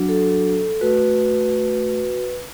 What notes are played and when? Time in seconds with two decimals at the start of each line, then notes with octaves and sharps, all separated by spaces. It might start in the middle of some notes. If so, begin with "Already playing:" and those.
Already playing: F#3 D4 F#4
0.09 A4
0.81 A3 F#4 B4